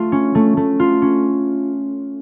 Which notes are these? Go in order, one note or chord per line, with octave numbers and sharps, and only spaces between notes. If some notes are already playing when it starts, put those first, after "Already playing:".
Already playing: A3 F4
C#4
A3
A3
F4
C#4